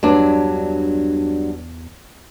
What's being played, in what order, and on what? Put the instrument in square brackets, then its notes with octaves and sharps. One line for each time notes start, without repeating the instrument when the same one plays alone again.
[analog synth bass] E2 [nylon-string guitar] G2 F#3 D4